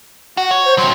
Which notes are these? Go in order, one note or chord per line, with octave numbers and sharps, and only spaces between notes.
F#4 F#5
C#5
C5
G2 F#3 C6